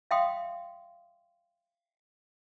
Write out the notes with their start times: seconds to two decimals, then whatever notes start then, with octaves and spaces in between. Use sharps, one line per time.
0.11 E5 F5 G5 C6 D#6